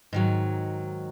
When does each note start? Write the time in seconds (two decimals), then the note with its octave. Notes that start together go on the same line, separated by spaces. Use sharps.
0.13 G#2 D#3 F#3